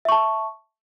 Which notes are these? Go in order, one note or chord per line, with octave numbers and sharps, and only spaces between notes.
E5 A5 C#6